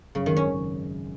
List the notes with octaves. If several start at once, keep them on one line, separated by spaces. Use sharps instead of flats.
F#2 C#3
G#1 D#3
C#4
C#3